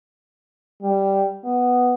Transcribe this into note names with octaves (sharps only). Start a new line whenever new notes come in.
G3
B3